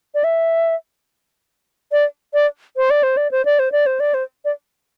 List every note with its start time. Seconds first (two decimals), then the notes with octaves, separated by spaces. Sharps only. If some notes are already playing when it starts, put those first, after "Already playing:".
0.14 D5
0.24 E5
1.92 D5
2.34 D5
2.76 C5
2.90 D5
3.03 C5
3.17 D5
3.31 C5
3.45 D5
3.59 C5
3.72 D5
3.86 C5
4.00 D5
4.14 C5
4.45 D5